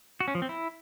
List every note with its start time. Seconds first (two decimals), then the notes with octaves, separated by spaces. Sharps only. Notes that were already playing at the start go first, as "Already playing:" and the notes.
0.20 F#4
0.28 C#4
0.35 F3
0.42 C4
0.49 E4